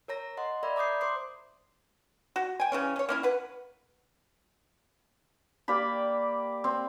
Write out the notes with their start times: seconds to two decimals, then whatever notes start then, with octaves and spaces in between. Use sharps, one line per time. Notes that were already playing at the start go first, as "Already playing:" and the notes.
0.08 A#4 C#5 A#5 A#6
0.37 D#5 F#5 C6
0.63 A#4 D5 E5 B5
0.76 A#5 D6 D#6 G6 C7
1.01 C5 C6 D6 C7
2.36 F#4
2.60 G5 G#5
2.72 C#3 E3 C#4
2.96 C#4 C#5
3.09 A#3 C#4 E4
3.23 B4 F#5
5.68 A#3 G4 D5 B5
6.64 C4